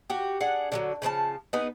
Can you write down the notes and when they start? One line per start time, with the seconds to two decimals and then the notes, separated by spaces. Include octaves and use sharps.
0.10 F#4 G4
0.41 D4 G#4 F#5
0.72 D3 F3 F#3
1.02 C#3 F3 A#4 A5
1.53 B3 D#4 G#4 B4